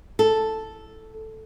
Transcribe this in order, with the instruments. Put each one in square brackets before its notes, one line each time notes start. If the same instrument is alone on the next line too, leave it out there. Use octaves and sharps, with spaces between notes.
[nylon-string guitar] A4